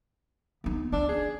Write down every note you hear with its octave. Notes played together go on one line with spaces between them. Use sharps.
B3 D#4
C#4 D4
G#4